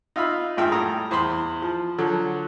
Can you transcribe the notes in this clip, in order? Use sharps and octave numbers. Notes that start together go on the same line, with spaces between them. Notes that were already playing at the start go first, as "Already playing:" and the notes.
D#4 F4 E5 F5 B5
G#1 G2 F4 E5 G5 E6
A2 G3 A#5 D#6
E2 C5 B5 C6
F3
D3 F3 F#3